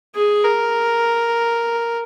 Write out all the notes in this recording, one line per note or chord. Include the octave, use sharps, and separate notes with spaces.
G#4
A#4